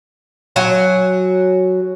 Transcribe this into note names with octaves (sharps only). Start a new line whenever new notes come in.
F#3 F#5 G#5